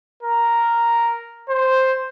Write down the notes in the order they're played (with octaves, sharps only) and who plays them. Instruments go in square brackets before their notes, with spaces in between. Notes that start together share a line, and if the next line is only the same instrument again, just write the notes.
[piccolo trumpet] A#4
C5